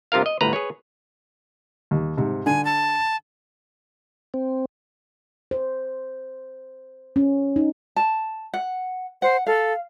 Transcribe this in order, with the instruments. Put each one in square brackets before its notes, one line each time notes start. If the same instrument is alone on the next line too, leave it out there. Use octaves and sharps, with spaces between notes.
[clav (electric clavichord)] G2 C3 F4 A#4 F5
D#5
G1 D2 A2 B4 A#5
G#4 B4 C#5
[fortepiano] D#2
G#2 C3
[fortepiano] D3 [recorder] G#5
[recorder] A5
[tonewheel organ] C4
[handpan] C5
C#4
D#4
[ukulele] A5
F#5
[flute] C5 [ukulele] F#5
[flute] A4 [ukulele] F5